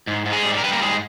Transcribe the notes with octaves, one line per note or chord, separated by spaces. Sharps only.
G#2
G#2
G#3 G#4
G3
A#4
G3 B4
A#3 A#4
G#2 G#3 G#4